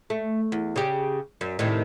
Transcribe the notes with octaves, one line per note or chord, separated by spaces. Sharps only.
A3
E2
C#3 G4
F#2
A2 C3 D#3